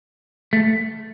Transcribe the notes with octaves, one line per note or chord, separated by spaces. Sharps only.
A3